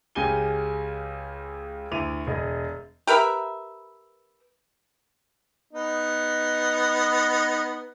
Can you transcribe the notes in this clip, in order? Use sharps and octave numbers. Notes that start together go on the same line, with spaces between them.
C#2 C#3 G4 G#5 D#7 G7
D2 E4 D6 D#7 F7
E1 G#4 D#5
G4 A#4 B4 E5
B3 D#4